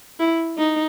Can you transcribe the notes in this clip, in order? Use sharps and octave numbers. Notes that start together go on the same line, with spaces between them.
E4
D#4